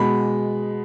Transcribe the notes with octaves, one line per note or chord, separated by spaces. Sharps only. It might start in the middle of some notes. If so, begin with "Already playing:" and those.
Already playing: B2 G#3 B5